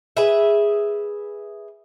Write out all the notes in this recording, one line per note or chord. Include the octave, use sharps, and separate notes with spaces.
G#4 B4 E5